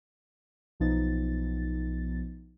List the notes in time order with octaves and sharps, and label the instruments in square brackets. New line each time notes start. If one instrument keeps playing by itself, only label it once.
[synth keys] B1 F3 B3 D#4 A6